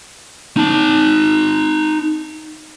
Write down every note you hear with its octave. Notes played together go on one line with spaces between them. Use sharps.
D#4 A5